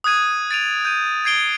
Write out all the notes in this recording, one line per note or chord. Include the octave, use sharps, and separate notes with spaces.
D#6 F#6 G#6 D#7
A6 D7 D#7 F7
G6 D#7
G6 G#6 C7 D7 G7